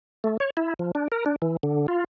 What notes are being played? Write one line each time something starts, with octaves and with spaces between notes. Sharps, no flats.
A3
C#5
E4
F3
D4
A#4
D4
E3
D3
F4